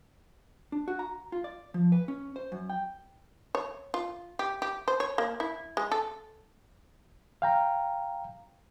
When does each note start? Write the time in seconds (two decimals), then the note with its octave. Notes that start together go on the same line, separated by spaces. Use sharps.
0.72 D4
0.88 F#4
0.99 A#5
1.32 F4
1.44 D5
1.74 F3
1.92 B4
2.08 C#4
2.36 C5
2.52 F#2
2.70 G5
3.55 C#5
3.94 F4
4.39 G4
4.62 G4
4.88 C5
5.00 C#5
5.18 A#3
5.40 E4
5.77 G#3
5.92 A4
7.42 F5 G5 A#5